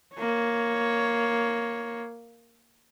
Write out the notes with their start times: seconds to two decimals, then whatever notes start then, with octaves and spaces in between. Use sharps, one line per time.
0.15 A#3 C#5